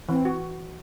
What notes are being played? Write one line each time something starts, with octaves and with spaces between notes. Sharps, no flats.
E3 C4
F#4